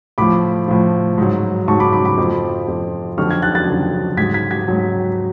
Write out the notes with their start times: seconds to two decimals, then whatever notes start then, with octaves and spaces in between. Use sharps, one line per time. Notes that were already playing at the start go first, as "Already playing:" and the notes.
0.18 A2 F3 B5 D6
0.68 A2 F3
1.18 G#2 F#3
1.68 G#2 F#3 A5 C#6
1.80 B5 D6
1.92 B5 D6
2.05 B5 D6
2.18 F2 F3
2.68 F2 F3
3.17 F2 D3 F#3 C#6 F6
3.30 F6 G#6
3.42 F#6 A6
3.55 F#6 A6
3.67 F2 D3 F#3
4.17 G#2 F#3 G#6 B6
4.34 G#6 B6
4.51 G#6 B6
4.68 G#2 F#3